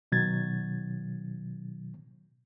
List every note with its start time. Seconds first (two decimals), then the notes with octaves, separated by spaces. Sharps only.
0.12 B2 D#3 F#3 G#6 A6